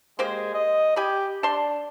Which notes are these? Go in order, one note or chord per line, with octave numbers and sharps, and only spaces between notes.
G#3 A#3 G4 C5
D#5
G4 G#5 B5
D4 A5 C6